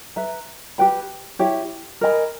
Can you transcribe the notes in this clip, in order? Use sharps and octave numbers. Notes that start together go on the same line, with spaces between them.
B4 E5 A#5
G4 B4 G5 B5
E4 G4 C#5 G5
A#4 D#5 G#5 B5